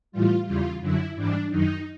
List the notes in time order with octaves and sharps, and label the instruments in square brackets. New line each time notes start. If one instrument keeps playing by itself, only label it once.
[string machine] A2 E3 G3 F4
E2 C#3 E3 G3 F4
F#2 D3 F#3 E4
G#2 E3 G3 D4
F#2 D#3 F#3 D#4